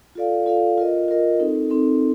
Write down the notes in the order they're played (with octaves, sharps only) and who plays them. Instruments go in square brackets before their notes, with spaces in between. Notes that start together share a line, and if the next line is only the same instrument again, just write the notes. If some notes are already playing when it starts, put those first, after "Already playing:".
[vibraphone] F4 A4 D5 F5
F4 A4 D5 F5
F4 A#4 D#5
F4 A#4 D#5
C4 D#4 A4
C4 D#4 A4